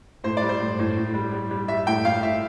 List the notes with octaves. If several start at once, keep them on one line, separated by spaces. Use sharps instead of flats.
A2 C5
D5
G3
C5
A2
A2
A2
G3
G3
G3
G3 E5
A2 G5
A2 F5
A2 E5